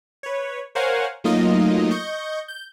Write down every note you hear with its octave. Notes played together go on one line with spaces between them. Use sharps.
B4 C#5
A#4 C5 C#5 F5 F#5 G#5
F#3 A3 A#3 D#4 F4 D#5
D#5 C#6 G6
G6